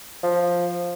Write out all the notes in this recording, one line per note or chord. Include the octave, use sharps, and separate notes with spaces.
F3